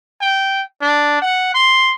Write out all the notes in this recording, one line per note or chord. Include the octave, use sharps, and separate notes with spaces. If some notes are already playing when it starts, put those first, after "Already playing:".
G5
D4
F#5
C6